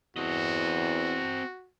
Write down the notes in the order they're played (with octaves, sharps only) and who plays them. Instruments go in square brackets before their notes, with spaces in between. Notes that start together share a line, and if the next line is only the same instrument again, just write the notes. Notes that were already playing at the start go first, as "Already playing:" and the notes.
[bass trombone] E2 [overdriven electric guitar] C4 D#5 [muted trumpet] F#4